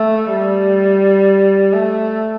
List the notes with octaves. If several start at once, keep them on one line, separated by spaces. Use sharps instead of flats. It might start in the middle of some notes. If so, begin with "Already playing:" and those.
Already playing: A3
G3
A3